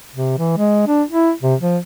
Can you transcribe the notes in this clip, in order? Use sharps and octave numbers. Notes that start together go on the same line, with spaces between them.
C3
E3
G#3
D4
E4
C3
F3